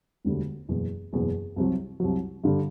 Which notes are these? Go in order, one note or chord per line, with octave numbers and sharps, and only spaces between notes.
E1 D2 D3 G3
F#1 E2 B2
F#1 E2 B2
C2 C3 F#3
C2 C3 F#3
G2 D3 G3